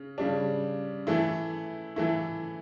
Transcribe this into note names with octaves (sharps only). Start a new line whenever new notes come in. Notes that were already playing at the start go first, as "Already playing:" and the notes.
Already playing: C#3
C#3 G3 D4
E3 A3 E4
E3 A3 E4